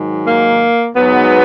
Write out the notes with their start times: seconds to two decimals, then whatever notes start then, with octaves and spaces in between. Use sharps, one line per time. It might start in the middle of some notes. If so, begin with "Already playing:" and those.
Already playing: G#2 D#3 F#3
0.26 A#3
0.95 G#2 F#3 B3